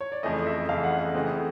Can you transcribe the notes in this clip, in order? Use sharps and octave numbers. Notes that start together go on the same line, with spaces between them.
C#5
D5
F2 C#3 E3 A3 D#5
E5
F2 C#3 E3 A3 F5
F#5
F#5
C#3 E3 A3 C4 D#5